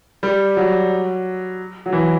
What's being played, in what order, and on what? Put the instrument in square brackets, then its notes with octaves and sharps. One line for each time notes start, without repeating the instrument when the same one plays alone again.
[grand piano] G3
F#3
F#3
E3